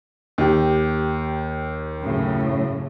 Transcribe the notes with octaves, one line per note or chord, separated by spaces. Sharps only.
D#2 G4
F#2 A2 C#3